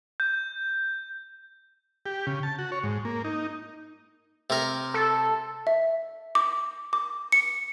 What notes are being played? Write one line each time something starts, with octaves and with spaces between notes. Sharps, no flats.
G6
G4
C#3
A5
F#4
C#5
G#2
A#3
D#4
C3 A#4
A4
E5
D6
D6
C#7